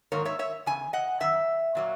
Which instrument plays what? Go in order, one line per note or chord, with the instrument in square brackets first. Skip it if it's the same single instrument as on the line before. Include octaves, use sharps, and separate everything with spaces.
[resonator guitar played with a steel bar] G#2 D#3 F#3 A#3 A#4 C#5
C#5 E5
C#5 E5
E2 C#3 G#5
D#5 F#5
F#2 D#3 E5
A#2 F#3 A#3